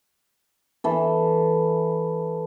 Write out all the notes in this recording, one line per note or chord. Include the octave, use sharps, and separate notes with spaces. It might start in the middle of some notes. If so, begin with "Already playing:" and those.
E3 A4